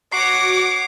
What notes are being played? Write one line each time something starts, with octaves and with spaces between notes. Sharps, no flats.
F#4 C#5 F#5 D6 C7